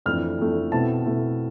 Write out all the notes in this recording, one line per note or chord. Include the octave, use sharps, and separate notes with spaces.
F2 E3 A3 D4 F6
F2 E3 A3 D4
B2 A3 C4 E4 A5
B2 A3 C4 E4